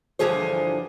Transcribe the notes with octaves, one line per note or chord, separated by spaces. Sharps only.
G2 D3 E3 F3 G#4 C5